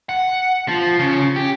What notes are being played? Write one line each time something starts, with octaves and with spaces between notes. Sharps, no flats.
F#5
F3
C#3
G4